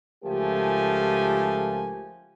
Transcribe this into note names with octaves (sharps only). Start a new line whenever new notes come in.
C#2 F3 A3 G4 A#4 G#5